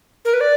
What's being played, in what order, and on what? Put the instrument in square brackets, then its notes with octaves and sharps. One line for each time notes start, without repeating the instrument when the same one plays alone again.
[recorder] A#4
B4
D5